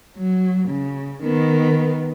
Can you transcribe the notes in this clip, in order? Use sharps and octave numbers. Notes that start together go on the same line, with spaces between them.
F#3
C#3
D#3 B3